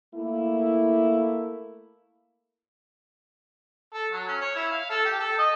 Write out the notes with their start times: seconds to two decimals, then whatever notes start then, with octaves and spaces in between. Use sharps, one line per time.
0.15 A3 A#3 E4
3.94 A4
4.12 F#3
4.28 C#4
4.41 C#5
4.56 E4
4.71 F5
4.90 A4
5.05 G4
5.19 A4
5.38 D#5